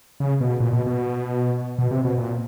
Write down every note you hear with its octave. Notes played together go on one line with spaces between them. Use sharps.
C#3
B2
A#2
B2
B2
B2
C3
B2
A#2